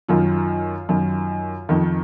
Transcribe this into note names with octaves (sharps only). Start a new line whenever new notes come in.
F#2 D#3 F4
F#2 D#3
F2 D#3